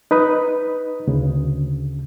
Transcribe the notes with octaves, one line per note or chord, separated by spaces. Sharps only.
D#4 B4 B5 D#6
D2 C#3